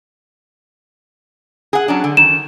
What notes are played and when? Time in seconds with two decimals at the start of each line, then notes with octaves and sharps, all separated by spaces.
1.73 G#4 F#5
1.88 F#3 C#4 D4
2.04 D3
2.17 D#3 E7